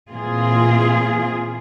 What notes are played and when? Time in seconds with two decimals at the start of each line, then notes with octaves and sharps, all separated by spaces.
0.13 A#2 E3 C4 F4 G#4